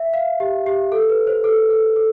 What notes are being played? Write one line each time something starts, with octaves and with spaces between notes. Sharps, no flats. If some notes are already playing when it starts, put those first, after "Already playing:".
Already playing: E5
F5
G4
G4
A4
B4
C5
A4
A4
A4